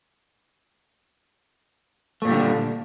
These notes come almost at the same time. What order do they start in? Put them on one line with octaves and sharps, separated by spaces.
A3 A#2 G3 D3